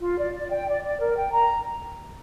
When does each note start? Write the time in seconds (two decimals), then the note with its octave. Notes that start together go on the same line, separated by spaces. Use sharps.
0.01 F4
0.18 D5
0.34 D5
0.51 G5
0.68 D5
0.83 D5
1.00 A#4
1.17 G5
1.32 A#5